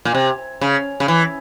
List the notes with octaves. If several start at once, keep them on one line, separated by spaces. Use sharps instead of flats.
A#2
C3
C#3
C#3
E3